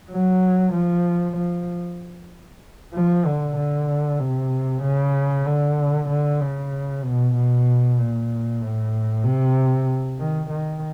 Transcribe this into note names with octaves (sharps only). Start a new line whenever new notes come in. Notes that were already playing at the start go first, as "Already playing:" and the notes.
F#3
F3
F3
F3
D3
D3
C3
C#3
D3
D3
C#3
B2
B2
A#2
A2
C3
D#3
D#3